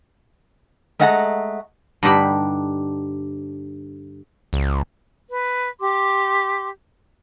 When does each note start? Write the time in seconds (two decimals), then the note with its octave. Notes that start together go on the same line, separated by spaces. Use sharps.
0.99 G#3 A3 D#5 F#5 G5 A#5
2.03 G2 D3 D#4 G4 B5
4.53 C#2
5.29 B4
5.80 G4 C6 D6